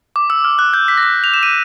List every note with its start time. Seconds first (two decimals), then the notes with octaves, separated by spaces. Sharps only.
0.16 D6
0.30 E6
0.45 F6
0.59 F#6
0.74 G6
0.88 B6
0.98 A#6
1.03 B6
1.24 F7
1.34 E7
1.43 D#7